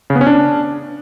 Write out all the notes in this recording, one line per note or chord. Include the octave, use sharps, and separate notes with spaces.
C#3
B3
C#4
D4